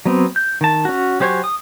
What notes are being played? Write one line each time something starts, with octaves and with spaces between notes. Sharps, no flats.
F#3 B3 C4
G6
D#3 A5
C#4 F#4
F#3 G4 C5 C#5 G#5
D#6